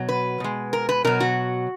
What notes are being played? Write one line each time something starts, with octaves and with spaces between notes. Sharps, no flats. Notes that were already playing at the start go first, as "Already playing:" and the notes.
Already playing: B2 F#3
B4
B2 G#3
A#4
B4
B2 F#3 A#4
F#4